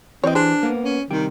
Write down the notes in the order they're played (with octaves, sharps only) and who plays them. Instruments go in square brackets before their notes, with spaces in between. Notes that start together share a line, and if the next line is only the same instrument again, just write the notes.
[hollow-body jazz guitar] E3 G4 [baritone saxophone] C4 [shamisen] C#5 D#5
[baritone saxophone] D4 [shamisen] G#4 C5
[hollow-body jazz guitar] A#3 B3
[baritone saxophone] C#4
[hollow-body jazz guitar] C3 G3 G4 [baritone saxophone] D#3